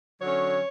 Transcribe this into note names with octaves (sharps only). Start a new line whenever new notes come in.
D3 F#3 C#4 C#5